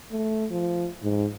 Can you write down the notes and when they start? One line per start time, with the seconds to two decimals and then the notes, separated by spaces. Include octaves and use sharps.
0.12 A3
0.51 F3
1.03 G#2